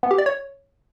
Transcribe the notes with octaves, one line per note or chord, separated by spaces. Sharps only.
B3
G4
D5
C#5